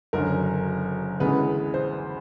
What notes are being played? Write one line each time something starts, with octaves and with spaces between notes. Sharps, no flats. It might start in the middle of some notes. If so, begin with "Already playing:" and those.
F#1 F#2 D3 F#3 A#4
D2 C#3 E3 G#3 B3 B4
C5